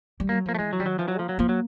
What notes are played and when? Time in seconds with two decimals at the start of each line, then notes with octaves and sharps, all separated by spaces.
0.20 G3
0.29 F#3 A#3
0.46 F3 A#3
0.55 A3
0.59 E3 G#3
0.73 F#3
0.79 D#3 G3
0.86 F#3
0.99 E3 F3
1.08 F#3
1.18 F3 A#3
1.29 F#3
1.39 F3 A#3
1.49 F#3